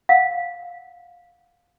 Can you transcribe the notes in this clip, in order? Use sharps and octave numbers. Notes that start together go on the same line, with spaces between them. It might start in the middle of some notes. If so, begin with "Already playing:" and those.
F5 F#5